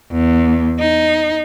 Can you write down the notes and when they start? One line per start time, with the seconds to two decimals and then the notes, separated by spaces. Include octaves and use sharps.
0.12 E2
0.79 D#4